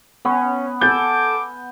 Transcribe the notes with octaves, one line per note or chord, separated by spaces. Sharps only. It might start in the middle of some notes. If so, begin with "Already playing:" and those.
B3 C#4
A4 G#5 D6 G6